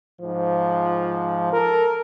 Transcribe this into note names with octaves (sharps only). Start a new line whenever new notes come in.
G#2 F3
A4 A#4